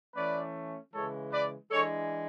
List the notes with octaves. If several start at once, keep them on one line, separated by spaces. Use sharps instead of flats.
E3 A3 C#4 B4 D5
C#3 E3 G#3 A4 C#5
B4 D5
E3 G#3 D4 A4 C#5